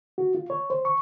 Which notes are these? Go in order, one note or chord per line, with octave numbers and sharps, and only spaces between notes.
F#4
F4
C#5
C5
C#6